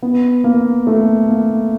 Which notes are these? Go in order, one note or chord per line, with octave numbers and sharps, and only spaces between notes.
B3
A#3
A3
A#3